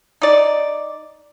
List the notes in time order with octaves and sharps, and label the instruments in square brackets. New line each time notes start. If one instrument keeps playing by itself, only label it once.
[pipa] D#4 D5